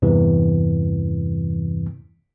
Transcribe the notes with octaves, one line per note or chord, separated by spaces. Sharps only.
E2 G2 C3 E3